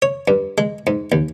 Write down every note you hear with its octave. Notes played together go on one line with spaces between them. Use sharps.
C#5
G2
G#3
G#2
D#2